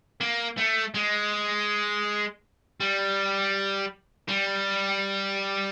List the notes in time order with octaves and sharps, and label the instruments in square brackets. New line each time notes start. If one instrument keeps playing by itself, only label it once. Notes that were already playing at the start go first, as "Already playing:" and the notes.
[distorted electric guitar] A#3
A3
G#3
G3
G3